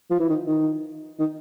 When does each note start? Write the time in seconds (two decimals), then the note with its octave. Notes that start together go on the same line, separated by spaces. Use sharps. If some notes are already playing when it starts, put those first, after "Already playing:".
0.10 F3
0.20 E3
0.29 D#3
0.47 D#3
1.19 D#3